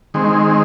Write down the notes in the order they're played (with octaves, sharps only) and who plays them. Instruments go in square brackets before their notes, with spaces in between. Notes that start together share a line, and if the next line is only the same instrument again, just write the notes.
[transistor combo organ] D#3 G#3 C4